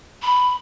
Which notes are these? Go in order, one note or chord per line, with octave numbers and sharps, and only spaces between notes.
B5